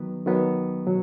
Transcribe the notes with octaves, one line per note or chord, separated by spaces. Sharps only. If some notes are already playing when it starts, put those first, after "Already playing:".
Already playing: D#3 F#3 B3
D#3 F#3 B3
B2 F#3